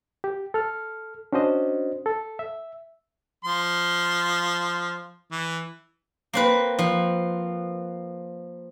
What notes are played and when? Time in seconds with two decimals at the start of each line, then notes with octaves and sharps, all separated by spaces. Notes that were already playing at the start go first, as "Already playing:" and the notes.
0.24 G4
0.54 A4 F6
1.33 C#4 D4 F#4 C5 D#5
2.06 A4
2.39 E5
3.44 F3 C6
5.31 E3
6.33 A#3 C4 B4
6.79 F3